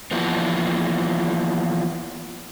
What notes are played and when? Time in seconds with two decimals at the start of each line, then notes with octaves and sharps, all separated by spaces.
0.11 E3 F3 A#3 B3